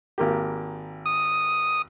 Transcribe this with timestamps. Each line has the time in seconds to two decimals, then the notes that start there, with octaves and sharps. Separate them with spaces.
0.18 G#1 A#3 G4
1.06 D#6